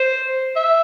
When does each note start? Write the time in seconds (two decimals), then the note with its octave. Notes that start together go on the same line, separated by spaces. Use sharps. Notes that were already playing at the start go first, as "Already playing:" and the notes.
Already playing: C5
0.56 E5